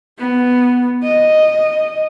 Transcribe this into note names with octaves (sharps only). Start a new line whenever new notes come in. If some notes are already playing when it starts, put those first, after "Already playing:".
B3
D#5